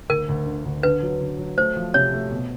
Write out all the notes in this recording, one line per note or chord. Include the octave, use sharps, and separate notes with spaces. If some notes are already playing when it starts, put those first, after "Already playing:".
D2 A#4
D2
D3
D2
D3 B4
F#3
D3
F#3
A3 C5
F3
C3 C#5
A3
B2